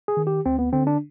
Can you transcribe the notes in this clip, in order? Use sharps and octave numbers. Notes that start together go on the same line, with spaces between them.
G#4
D#3
G4
D2 C4
B3
D3 C4
D4